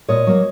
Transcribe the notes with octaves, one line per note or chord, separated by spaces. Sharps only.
A#2 C#5 D#5
F#3 A#3